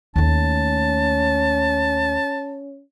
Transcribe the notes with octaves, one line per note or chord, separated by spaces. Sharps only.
D#2 A3 C#4 A5